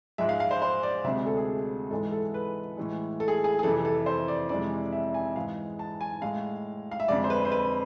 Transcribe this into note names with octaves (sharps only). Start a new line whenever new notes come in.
G#2 F3 G#3 E5
F5
F5
C5
C5
D5
D2 C3 G#3 E5
A4
G#4
G#2 E3 G#3 A4
A4
B4
A2 E3 G#3
A4
G#4
G#4
G#4
F2 C3 E3 A4
A4
C5
D5
F2 C3 E3 G#3 D5
E5
G#5
G#2 E3 G#3 F5
A5
G#5
A2 G#3 F5
F5
E5
F2 D3 G#3 D5
C5
B4
C5
B4